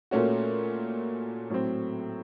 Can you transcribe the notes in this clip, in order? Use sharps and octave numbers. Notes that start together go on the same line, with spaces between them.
A#2 A3 C#4 F#4
A2 F#3 C4